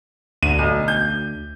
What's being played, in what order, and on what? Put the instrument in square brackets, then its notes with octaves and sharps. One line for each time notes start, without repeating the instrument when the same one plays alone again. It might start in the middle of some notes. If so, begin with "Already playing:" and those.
[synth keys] D2 [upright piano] D#7
[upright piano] B1
G6